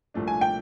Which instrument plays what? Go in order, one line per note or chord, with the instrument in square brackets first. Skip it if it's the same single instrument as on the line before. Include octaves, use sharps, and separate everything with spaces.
[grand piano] C2 A#2 F3 A3 D4
[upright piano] G#5
G5